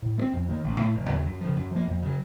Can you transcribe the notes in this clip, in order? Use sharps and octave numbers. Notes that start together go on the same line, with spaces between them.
A2
A3
C4
F2
D#3 A#3
A1
A2 A3
F1
D#2 C#3 F#3
F#2
C#3 F3
F#2
F3 A#3
F2
C#3 F#3